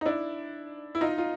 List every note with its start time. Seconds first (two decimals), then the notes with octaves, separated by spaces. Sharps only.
0.01 D#4
0.05 D4 E4
0.95 E4
1.01 D#4 F4
1.18 F4